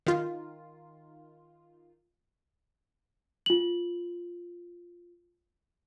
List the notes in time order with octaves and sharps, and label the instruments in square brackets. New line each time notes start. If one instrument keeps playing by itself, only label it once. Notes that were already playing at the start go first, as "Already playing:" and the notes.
[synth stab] D#3 F4
[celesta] F4 F#7